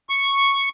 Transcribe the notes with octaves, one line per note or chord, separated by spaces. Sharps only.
C#6